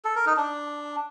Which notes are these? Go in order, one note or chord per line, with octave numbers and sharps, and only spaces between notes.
A4
A#4
D#4
D4